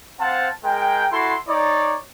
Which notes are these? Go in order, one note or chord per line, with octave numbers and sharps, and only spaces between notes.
C4 C5 F5 F#5 A5
G#3 A#4 G5
E4 F#4 A4 C6
D#4 C#5 D5